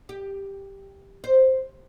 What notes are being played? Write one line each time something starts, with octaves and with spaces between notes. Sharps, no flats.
G4
C5